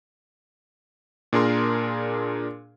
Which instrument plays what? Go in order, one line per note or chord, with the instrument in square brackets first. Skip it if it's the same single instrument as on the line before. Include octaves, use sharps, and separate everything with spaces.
[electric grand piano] A#2 D4 G#4 A#4 C6